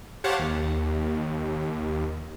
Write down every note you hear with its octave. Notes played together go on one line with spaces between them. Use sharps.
G4 C5 C#5 F5 F#5 A5
D#2